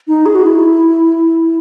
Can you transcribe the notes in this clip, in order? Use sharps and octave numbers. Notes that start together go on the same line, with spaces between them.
D#4
G#4
F#4
E4